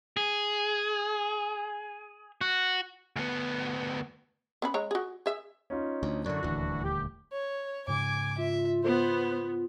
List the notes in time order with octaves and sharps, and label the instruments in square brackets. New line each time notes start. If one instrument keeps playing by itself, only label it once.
[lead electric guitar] G#4
F#4
D2 B3
[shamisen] B3 C#4 B5
G#3 C#5 A#5
F#4 G#4
G#4 E5
[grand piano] C#4 D#4 F4
[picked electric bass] D2
[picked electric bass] F#2 D3 [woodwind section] D4 E4 F#4 [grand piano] D5
[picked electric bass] D#1 D2 [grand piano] E3
[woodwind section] G4
[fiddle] C#5
[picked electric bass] G#2 C#3 [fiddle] G#5 D6
[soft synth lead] F4 [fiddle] E5
[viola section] B3 [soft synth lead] F4 [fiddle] C5